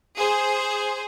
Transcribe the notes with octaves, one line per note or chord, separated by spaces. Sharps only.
G#4 C5